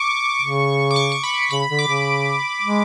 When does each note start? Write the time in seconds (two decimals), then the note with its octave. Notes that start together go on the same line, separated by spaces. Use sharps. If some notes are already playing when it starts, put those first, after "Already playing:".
Already playing: C#6 D6
0.42 C#3
0.91 D6
0.96 C#6
1.12 C#6
1.23 B5
1.51 C#3 B5
1.70 D3
1.79 D6
1.88 C#3
2.62 G#3